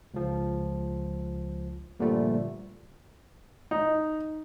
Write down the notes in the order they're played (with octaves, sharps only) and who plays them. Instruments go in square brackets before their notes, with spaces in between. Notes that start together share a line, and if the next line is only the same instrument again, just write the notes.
[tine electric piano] C#2 F3
G2 A#2 D3 F3 G3 A3
[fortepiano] D#4